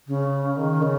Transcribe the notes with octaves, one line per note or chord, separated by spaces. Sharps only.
C#3
D#3
C#3